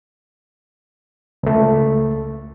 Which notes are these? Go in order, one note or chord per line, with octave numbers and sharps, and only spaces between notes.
C#2 A3